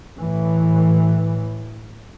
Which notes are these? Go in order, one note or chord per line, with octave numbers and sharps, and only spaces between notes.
A2 E3